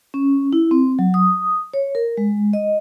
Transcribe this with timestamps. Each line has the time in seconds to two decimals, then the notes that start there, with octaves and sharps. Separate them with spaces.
0.14 C#4
0.53 E4
0.71 C4
0.99 F#3
1.14 D#6
1.74 C#5
1.95 A#4
2.17 G#3
2.53 D#5